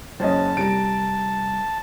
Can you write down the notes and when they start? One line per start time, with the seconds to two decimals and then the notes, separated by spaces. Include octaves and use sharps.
0.20 F#1 C#4 C5 D#5 A5
0.57 C3 G3 A#5 D7